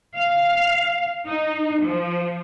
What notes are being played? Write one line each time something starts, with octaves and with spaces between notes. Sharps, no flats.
F5
D#4
F3